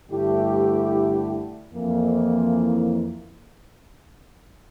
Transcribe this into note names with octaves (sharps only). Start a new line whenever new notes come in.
G2 D3 A3 E4 G4
F2 E3 A#3